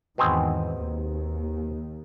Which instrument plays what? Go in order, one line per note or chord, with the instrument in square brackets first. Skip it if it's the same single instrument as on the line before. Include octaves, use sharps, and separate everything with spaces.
[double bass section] E2 G#2 D#3 [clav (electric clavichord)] B2 C4 G#4
[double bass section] D#2